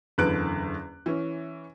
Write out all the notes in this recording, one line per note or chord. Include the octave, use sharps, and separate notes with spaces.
F#1 E2 D3 B4 F#6 D7
E3 C#4